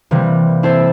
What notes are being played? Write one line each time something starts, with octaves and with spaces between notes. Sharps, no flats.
C3 E3 G3 A#3
C4 E4 A4 C5 E5